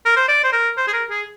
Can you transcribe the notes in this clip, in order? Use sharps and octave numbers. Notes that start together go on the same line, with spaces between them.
A#4
C5
D5
C5
A#4
C5
G#4
A#4
G#4